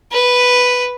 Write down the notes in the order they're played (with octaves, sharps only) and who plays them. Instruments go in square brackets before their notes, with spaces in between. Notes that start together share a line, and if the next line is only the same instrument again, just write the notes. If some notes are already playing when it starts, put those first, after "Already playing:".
[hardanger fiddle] B4